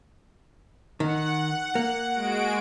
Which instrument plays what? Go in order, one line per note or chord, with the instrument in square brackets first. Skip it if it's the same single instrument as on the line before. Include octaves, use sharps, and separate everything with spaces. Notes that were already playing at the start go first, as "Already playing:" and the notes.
[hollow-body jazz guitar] D#3 [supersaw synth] F#5
[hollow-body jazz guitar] A#3
[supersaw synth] G#3 F#4 D7